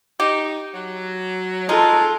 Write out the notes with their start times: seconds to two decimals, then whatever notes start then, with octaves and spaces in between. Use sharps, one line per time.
0.20 D#4 G4
0.74 F#3
1.69 G#3 D#4 F4 A4